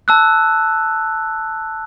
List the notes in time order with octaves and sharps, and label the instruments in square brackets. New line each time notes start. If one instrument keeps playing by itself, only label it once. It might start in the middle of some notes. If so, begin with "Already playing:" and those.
[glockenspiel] A5 E6 F#6